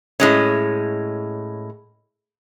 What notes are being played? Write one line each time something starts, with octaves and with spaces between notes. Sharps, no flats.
A2 G#3 C#4